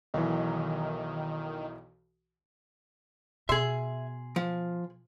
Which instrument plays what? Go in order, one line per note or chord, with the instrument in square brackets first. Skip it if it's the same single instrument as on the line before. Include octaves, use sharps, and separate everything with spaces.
[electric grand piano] B1 E3 [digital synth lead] D#3
[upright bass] B2 [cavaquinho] G#4 C6 [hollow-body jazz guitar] E5
[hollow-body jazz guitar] F3